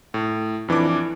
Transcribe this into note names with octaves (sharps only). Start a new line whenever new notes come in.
A2
F2 E3 D4 D6